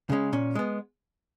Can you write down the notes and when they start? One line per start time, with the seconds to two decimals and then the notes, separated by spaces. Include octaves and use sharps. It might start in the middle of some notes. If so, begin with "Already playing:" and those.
0.10 C#3 G#3 C#4
0.33 A#2 C#4
0.55 G#3 B3